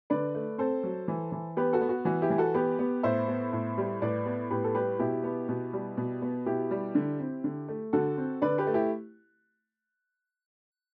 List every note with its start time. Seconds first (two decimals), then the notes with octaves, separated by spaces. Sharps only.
0.10 D3 B4 D5
0.35 A3
0.58 C4 A4 C5
0.83 F#3
1.08 E3
1.32 E3
1.57 B3 G4 B4
1.73 F#4 A4
1.81 B3
1.89 F#4
2.05 E3 F#4
2.22 E4 G4
2.30 E3
2.38 F#4 A4
2.54 B3 G4 B4
2.79 B3
3.03 A2 C5 E5
3.28 B3
3.53 A2
3.78 G3
4.02 A2 B4 D5
4.26 B3
4.50 A2 G4 B4
4.64 A4
4.75 G3 G4 B4
4.99 B2 E4 G4
5.23 B3
5.48 B2
5.73 G3
5.97 B2
6.22 B3
6.46 B2 E4 G4
6.71 G3
6.95 D3
7.20 C4
7.44 D3
7.68 A3
7.93 D3 F#4 A4
8.17 C4
8.42 D3 B4 D5
8.58 G4 B4
8.67 A3
8.74 E4 G4